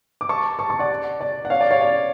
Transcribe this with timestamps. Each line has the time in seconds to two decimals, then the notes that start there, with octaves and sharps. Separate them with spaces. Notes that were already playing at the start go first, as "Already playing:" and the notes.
0.21 D6
0.29 A5 C#6
0.59 A5 C#6
0.70 A5 C#6
0.79 D5 F#5
1.21 D5
1.45 F#5
1.50 C#5 F5
1.61 D5
1.71 C#5 F5
1.81 D5